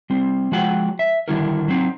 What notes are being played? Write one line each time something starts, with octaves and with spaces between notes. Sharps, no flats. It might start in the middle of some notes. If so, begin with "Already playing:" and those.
G3 C4
F3 G#3 F#4 F#5 G5
E5
D3 D#3 G3 E4 F#4 A#4
F#3 C4 D#4